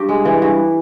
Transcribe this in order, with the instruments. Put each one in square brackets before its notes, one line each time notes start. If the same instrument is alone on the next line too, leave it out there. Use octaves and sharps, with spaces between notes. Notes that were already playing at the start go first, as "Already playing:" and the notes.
Already playing: [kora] G2 G4
G#3
E3
G2